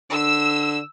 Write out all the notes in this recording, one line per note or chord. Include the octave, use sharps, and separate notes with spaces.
D3 E6